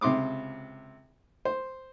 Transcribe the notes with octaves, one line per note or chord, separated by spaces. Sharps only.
C#2 C3 C6 D6 D#6
C5